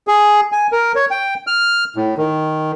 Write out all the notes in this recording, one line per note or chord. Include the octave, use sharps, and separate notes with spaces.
G#4
G#5
A#4
C#5
G5
F6
A2
D#3